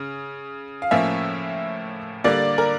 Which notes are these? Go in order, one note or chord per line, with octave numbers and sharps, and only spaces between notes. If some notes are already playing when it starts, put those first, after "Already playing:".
Already playing: C#3 C#4
F5
A2 F3 A#3 C#4 E5
D3 G3 A#3 D5
A#4